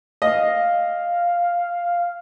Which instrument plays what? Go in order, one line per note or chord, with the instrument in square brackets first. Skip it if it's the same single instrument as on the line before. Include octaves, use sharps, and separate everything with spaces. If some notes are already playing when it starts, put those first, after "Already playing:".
[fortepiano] D#5 [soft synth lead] F5